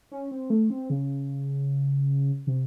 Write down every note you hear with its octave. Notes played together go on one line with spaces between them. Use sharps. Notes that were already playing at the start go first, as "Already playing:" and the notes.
C#4
C4
A3
C4
C#3
C3